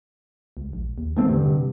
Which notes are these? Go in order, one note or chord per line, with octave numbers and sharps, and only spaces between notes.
C#2
A#1
D#2
A1 D#3 A3 C4
E2 G2 D3
C3